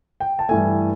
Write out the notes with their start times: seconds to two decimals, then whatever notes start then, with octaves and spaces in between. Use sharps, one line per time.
0.20 G5
0.39 A5
0.49 G2 E3 A3 G#5